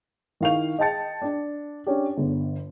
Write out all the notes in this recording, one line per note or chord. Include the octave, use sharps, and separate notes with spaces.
D#3 E4 F5 C#6 F7
D#5 G5 A5 A6 C#7
D4
C#4 D4 G4
G1 D3